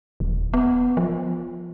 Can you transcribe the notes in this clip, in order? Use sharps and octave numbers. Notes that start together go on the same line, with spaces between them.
D#1
B3
F3